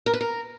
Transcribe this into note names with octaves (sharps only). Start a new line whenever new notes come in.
A#4
B4
A#4